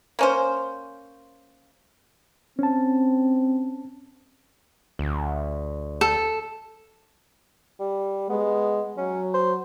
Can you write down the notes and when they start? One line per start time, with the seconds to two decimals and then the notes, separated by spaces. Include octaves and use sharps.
0.19 A#3 C#4 C5
2.59 C4 C#4 A5
4.99 D2
6.01 A4
7.80 G3
8.30 G#3 B3
8.98 F#3 C#4
9.34 C5